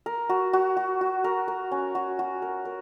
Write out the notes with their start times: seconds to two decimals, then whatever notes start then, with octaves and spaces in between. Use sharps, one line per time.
0.06 A#4
0.29 F#4
0.53 F#4
0.77 F#4
1.01 F#4
1.24 A#4
1.48 A#4
1.72 C#4
1.95 F#4
2.19 F#4
2.42 A#4
2.65 A#4